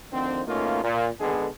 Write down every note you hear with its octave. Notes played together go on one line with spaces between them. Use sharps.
D2 D3 D#3 F3 C4
B2 A3 A#3 C#4 D#4 F4
A#2
G#1 D3 G#3 B3 G#4 A4